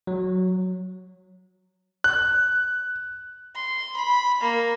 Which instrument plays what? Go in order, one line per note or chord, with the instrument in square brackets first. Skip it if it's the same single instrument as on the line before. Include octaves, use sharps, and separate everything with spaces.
[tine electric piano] F#3
[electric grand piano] F#6
[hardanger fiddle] C6
B5
A#3